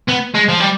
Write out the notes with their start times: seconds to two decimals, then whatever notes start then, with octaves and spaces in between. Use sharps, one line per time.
0.08 B3
0.34 G#3
0.49 F3
0.60 G3